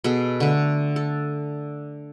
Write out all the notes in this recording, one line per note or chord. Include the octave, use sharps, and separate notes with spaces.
B2 G#4 A4
D3 A3
A4